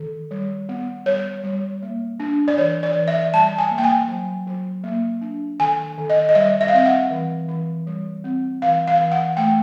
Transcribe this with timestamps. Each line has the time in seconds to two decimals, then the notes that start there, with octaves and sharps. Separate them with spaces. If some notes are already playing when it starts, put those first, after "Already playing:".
Already playing: D#3
0.31 G3
0.69 B3
1.06 G3 C#5
1.44 G3
1.82 A#3
2.20 D4
2.48 D5
2.57 E3 C#5
2.83 D5
2.95 E3
3.08 E5
3.33 G3 A5
3.58 G#5
3.71 A#3
3.78 G5
3.84 G#5
4.08 F#3
4.47 F#3
4.84 A#3
5.22 D4
5.60 D#3 G#5
5.98 D#3
6.10 D#5
6.29 D#5
6.35 G3 E5
6.61 E5
6.68 F5
6.73 C4 E5
6.86 F#5
7.11 E3
7.48 E3
7.87 G3
8.24 C4
8.62 E3 F5
8.87 F5
8.99 E3
9.12 F#5
9.37 A3 G5